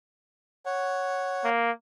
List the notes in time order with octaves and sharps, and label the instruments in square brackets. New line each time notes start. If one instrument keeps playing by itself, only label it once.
[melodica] C#5 F#5
[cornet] A#3